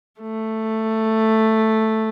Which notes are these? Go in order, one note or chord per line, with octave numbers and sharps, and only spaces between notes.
A3